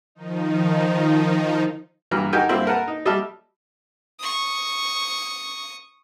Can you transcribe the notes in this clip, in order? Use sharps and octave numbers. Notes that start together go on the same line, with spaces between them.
D#3 F3 D#4
G2 E3 F#3 A#5 F6
D#4 F#4 G4 A#4 G5 G#5
G2 F#3 A#3 C4 E4
A#4 B4 F#5 A5
D#4
F#3 G3 D#5 E5 A5 F6
C#6 D#6